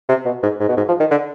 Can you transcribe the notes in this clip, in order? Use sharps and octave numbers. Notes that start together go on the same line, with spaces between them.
C3
B2
G#2
G#2
B2
G#2
F3
D#3
D3